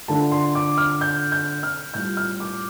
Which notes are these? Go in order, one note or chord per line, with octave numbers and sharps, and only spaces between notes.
D3 A3 F4 A5
C6
D6
F6
G6
G6
F6
A2 G3 F4 G6
F6
D6